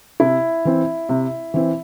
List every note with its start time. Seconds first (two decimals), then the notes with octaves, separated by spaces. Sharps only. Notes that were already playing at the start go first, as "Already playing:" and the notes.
0.20 C3 E4
0.65 E3 C4
1.09 C3
1.54 E3 C4